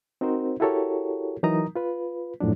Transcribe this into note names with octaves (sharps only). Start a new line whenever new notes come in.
C4 D#4 F#4 A#4 C5
E4 F#4 G4 A4 A#4 C#5
E3 F#3 D#4 A#4 A#5 D#6
F4 B4
F#2 A2 F3 F#3 D4